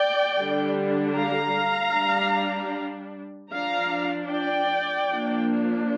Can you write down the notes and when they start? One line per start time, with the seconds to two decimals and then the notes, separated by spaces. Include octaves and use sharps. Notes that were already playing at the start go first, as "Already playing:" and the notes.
Already playing: D5 G5
0.37 D3 G3 D4
1.15 F5 A#5
1.94 G3 D4
3.51 F3 D4 F5 A#5
4.28 D5 G5
5.07 F3 A#3 D4